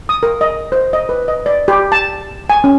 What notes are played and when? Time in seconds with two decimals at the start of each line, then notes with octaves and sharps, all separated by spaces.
0.09 D#6
0.23 A#4
0.41 D#5
0.72 C5
0.93 D#5
1.09 B4
1.28 D#5
1.46 D5
1.68 G4
1.92 A5
2.50 G#5
2.64 C#4